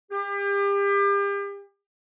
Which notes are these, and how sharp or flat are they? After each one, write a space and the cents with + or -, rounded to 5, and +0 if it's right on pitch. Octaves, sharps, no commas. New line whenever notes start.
G4 +35